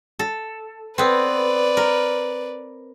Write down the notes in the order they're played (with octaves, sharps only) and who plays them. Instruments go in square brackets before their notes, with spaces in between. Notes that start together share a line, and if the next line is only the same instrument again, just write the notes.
[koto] A4
[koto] B3 C4 [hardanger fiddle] B4 D5
[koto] A#4